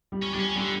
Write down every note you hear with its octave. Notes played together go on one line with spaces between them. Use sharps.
G3
C#4
G3 D4
C#4
D3 G3